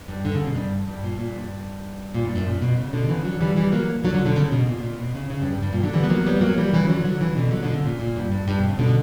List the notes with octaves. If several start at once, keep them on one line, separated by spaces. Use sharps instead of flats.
G2
D3
C#3
B2
G2
G2
A#2
A#2
G2
A#2
G2
F#2
A#2
B2
C#3
B2 D3
C#3 E3
D3 F#3
E3 G3
E3 G3
F#3 A#3
D3 F#3
D3 F#3
B2 D3
C#3
B2
A#2
B2
A#2
B2
C#3
C#3
G2
G2
G2
A#2
D3 F#3
E3 G3
B3
F#3 A#3
G3 B3
F#3 A#3
E3 G3
C#3 E3
D3 F#3
D3 F#3
C#3 E3
B2 D3
D3 F#3
B2 D3
C#3
A#2
A#2
G2
G2
G2
B2
C#3
B2 D3